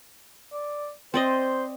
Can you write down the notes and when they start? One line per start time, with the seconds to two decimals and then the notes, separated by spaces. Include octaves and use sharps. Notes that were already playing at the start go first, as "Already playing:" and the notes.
0.52 D5
1.14 C4 C5 D5 D#5